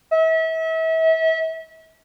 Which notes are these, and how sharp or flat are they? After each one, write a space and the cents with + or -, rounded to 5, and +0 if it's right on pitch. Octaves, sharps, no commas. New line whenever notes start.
E5 -35